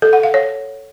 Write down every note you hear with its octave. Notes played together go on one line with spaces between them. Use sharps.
A4
F#5
F5
C#5